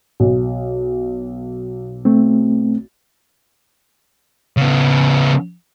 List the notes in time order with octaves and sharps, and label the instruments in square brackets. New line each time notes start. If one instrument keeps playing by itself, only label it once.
[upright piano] B1
[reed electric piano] A3 C4
[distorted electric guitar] C#3 B3